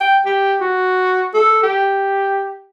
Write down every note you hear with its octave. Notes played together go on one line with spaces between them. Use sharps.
G5
G4
F#4
A4
G4